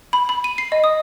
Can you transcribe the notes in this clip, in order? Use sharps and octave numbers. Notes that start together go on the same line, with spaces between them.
B5
B5
D#7
C7
D#5
D#6